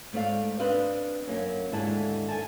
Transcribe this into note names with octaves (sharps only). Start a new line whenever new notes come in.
G#2 A3 C4 D5 F5
C4 D4 B4 C5 D#5 F5
F#2 A#3 C#4
D#2 G#2 D3 E4 G#4 A5
A4 G#5 A5